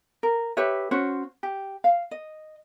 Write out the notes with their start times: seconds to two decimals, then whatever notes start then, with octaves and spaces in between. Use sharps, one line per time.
0.23 A#4
0.57 G4 B4 C#5 E5
0.91 C#4 F#4 C5 C#5
1.43 G4
1.84 F5
2.11 D#5